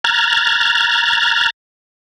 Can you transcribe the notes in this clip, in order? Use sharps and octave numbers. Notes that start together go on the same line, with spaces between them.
A#5 F6 F#6 G#6 A6